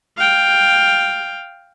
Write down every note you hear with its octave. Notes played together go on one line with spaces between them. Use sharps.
F5 G5